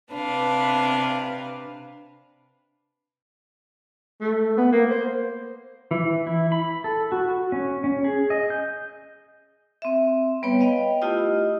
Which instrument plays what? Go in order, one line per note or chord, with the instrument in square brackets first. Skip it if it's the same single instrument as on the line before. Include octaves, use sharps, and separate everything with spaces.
[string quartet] C3 D4 B4 F5
[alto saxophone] A3
B3
A#3
C5
[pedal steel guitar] E3
E4
B5
A4
F#4
C#4
C#4
G#4
D#5
G6
[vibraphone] C4 E5
G3 B3 B4 C#5 G5
B4 D#5 F5 G5 B5
A3 E4 F4 G4 D#5 D#6